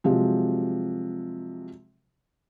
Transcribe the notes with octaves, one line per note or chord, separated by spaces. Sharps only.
C3 F3 F#3 G#3